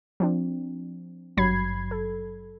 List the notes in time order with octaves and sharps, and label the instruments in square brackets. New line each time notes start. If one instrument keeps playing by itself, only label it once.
[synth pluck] F3 C4 D4
G#1 G2 F#3 B5 G#6 C7
A4